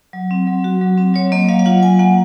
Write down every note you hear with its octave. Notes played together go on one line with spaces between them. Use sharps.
F#3
C4
F#3
F#4
F#3
C4
F#3 C#5
A#3 D#5
F#3 F5
F5
F4 F#5
F#3 G#5
A#3 F#5